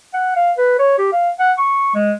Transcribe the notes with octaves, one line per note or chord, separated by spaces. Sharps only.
F#5
F5
B4
C#5
G4
F5
F#5
C#6
G#3